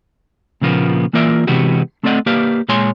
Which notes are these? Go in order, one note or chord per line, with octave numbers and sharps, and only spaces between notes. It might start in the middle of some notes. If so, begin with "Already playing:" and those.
A#2 C#3 F3 A#3 B3
E3 A#3 F4 A#4 D5 E5
C3 E3 G#3 B3 F#4 G4
A3 C4 A4 D5 D#5 F#5
A#3 G4 B4 D5 F5
A#2 G#3 C#5 G#5 C6